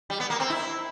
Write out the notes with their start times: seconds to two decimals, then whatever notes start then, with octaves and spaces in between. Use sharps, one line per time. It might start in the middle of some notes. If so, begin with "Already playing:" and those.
0.10 G3
0.20 B3
0.30 A#3
0.40 C4
0.50 E4